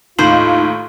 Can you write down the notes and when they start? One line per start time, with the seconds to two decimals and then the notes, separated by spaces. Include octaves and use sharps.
0.19 D#2 A2 D#4 F4 C5 F#7